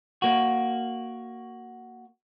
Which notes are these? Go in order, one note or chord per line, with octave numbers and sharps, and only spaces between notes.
A#3 F#4